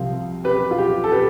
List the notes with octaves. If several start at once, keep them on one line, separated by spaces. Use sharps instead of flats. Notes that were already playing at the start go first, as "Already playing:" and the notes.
Already playing: C2 C3 F3 C4 F5
G4 B4
F4
G4
A4
G4 B4